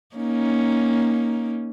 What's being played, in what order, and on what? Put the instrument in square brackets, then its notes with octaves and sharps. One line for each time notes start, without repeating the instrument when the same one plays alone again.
[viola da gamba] A#3 C#4 D#4